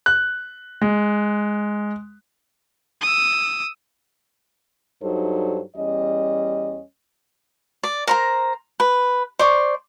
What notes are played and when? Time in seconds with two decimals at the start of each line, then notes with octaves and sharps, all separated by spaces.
0.06 F#6
0.82 G#3
3.02 D#6 E6
5.02 G2 F#3 D#4 A4 C5
5.76 E2 G3 C#4 D#5
7.83 D5
8.07 A#4 C5 A#5
8.80 B4
9.39 C5 D5 C#6